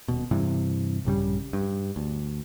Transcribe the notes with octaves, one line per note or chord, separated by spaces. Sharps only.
D#1 B2
G2 C3 E3
A#1 G2 C#3 G3
G2
D2